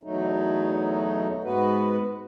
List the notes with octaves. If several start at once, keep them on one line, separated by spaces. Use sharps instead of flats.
E2 B2 F#3 A3 D#4
G#2 G#3 B3 F#4 B4